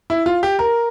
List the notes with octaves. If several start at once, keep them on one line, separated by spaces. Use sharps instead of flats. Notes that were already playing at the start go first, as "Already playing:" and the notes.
E4
F4
G4
A#4